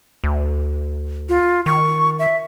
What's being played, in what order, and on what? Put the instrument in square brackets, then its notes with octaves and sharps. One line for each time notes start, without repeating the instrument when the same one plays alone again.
[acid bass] D2
[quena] F4
[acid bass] D#3 [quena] C#6
[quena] E5